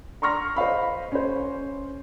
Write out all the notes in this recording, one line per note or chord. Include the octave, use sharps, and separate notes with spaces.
A#5 C6 C#6 F6 A#6
C5 D#5 F5 B5
C#4 C5